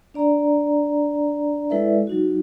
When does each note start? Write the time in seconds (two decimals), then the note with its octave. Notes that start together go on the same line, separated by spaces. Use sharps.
0.14 D4 D5 A#5
1.70 G#3 E4 A4 B4 D5 E5
2.07 F#3 D#4 F#4